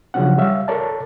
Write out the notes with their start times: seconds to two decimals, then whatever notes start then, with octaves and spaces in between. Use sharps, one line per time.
0.14 C#3 F3 F#3 C#4 D4 F#5
0.37 G3 C#5 E5 F5
0.68 A4 A#4 C#5 D5 A5